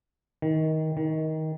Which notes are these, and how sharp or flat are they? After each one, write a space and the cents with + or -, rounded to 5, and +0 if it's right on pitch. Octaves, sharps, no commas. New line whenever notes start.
D#3 +20
D#3 +20